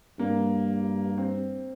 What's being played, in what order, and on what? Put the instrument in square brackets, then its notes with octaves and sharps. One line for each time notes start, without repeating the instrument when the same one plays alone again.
[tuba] G2 [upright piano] A#3
[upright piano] C4